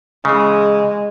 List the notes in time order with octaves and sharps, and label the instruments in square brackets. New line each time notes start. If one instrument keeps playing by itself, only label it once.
[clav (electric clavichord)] C#3 E3 [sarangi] G#3